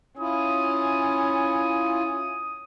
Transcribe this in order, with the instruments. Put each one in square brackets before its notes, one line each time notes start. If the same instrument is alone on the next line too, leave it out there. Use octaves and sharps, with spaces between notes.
[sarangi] C#4 [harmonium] E4 F4 [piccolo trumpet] D#6